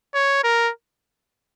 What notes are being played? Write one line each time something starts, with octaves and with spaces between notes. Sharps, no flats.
C#5
A#4